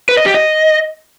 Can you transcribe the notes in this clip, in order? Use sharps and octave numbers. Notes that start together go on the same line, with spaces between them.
B4
D#5
G4
D#5